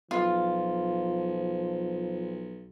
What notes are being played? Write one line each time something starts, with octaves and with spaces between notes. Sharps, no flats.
B1 F3 F4